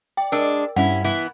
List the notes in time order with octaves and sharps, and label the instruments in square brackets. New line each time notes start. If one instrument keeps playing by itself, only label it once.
[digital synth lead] D5 [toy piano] G5
[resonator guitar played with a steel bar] G#3 D4 [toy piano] A#4 E6
[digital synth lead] G2 [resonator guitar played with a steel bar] C#4 E4 [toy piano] F#5
[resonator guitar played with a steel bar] E3 B3 E4